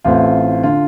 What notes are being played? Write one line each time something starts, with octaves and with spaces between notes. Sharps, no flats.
A1 A2 A3 C4 F4
D3 F4